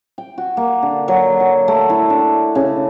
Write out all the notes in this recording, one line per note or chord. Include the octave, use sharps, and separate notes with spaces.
G5
F#4
A#3
D3
F#3
F#3
A3
E4
D4
C#3